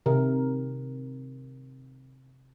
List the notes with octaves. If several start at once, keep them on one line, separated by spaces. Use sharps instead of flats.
C3 D#3 A#4